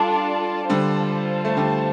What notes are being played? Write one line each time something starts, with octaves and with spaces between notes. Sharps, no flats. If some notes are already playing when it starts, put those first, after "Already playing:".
Already playing: G3 D4 F4 A4 D5 A5
D3 G3 F4 C5 A5
A3
D3 G3